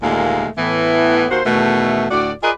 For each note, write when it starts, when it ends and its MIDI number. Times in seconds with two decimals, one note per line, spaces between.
0.03 0.48 39
0.03 0.48 46
0.03 0.48 50
0.03 0.48 56
0.03 0.48 57
0.03 0.48 77
0.58 1.27 45
0.58 1.27 52
0.58 1.27 59
1.31 1.41 39
1.31 1.41 58
1.31 1.41 66
1.31 1.41 72
1.46 2.06 40
1.46 2.06 47
1.46 2.06 51
1.46 2.06 57
2.11 2.34 38
2.11 2.34 45
2.11 2.34 66
2.11 2.34 74
2.43 2.51 65
2.43 2.51 68
2.43 2.51 70
2.43 2.51 71
2.43 2.51 74
2.43 2.51 75